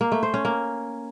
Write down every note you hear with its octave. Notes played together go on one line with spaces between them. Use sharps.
A#3
A3
C5
C#4
A#3